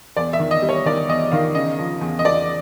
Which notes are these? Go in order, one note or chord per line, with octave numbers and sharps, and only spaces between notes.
E2 D5
E5
D#3
D#5
G3
C#5
D#3 D5
E2 D#5
D#3 F5
C#3 D#5
F3
E2
D#5
E2 D5